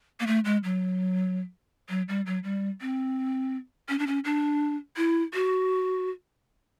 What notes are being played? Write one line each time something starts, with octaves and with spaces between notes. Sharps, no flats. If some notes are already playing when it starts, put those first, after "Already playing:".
A#3
A3
G#3
F#3
F#3
G3
F#3
G3
C4
C#4
D4
C#4
D4
E4
F#4